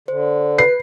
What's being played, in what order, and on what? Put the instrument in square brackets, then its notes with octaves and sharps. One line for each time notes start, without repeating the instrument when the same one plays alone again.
[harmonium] D3 [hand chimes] C5
[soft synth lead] B4 [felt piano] C7